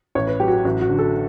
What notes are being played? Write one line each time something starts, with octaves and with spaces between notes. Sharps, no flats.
A1 C#5
B4
F#3 G4
F#4
G4
A1 F#4
F#4
D3
A4